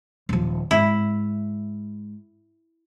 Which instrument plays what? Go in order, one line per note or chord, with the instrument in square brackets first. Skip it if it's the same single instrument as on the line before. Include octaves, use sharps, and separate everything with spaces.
[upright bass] D#1 F3
[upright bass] G#2 [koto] E4